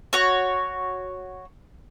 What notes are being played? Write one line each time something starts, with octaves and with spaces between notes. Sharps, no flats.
F#4 C#5